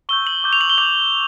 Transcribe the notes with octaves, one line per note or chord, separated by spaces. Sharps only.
C#6 E6 G6 G7
F#7
D6 G6
F7
F#7
G7
D6 G6 F#7